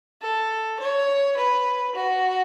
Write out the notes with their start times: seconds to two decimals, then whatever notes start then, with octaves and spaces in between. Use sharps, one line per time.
0.22 A4
0.80 C#5
1.37 B4
1.95 F#4